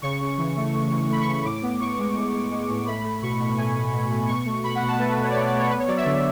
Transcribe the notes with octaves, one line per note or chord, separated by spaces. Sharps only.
C#3 C#6
C#3
E3
A3
A3
E3
A3 B5
C#6
C#3
C#6
A2 D6
B3
A2 C#6
G#3
A2
G#3
G#3
A2
A3 B5
A3
B2 C#6
B2
A3 G#5
B2
B2
A3
B2 C#6
A3
B2 B5
F#5
B2
A5
A3 B4
B4
B2
C#5
D5
A3 C#5
D5
A3
C#5
B3 B4
C#5
F#3 D5
E5
D3